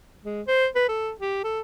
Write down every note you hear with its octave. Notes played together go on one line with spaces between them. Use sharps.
G#3
C5
B4
A4
G4
A4